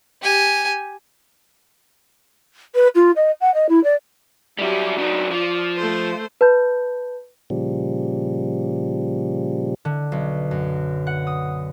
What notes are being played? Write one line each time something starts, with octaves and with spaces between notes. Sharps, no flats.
G4 G#5
B4
F4
D#5
F#5
D#5
E4
D5
F#3 G3 E4 G4
F#3 D4 D#4
F3 D5
A3 C5
B4 A5 B5 G6
A#2 C#3 F3 G3
D3
B1
F#2
F#5
D#6